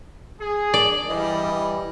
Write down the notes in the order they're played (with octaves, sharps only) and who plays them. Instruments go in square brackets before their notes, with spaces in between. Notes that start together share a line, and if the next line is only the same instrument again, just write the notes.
[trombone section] G#4
[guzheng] D5
[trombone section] G2 [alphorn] E3 [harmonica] G3 D#5